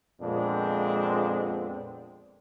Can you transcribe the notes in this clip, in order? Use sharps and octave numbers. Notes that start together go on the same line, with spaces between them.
F2 A#2 G#3 B3 C4 D4